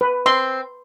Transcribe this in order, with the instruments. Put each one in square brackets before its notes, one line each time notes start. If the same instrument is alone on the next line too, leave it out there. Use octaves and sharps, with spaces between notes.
[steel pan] B4
[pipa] C4 [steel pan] C6